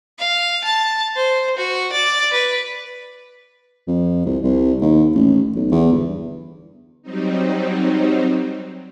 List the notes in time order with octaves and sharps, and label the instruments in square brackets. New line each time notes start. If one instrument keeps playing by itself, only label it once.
[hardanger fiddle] F5
A5
C5
F#4
D5
B4
[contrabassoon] F2
C2
C2
D#2
A1
B1
E2
G1
[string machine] F#3 G3 C4 D#4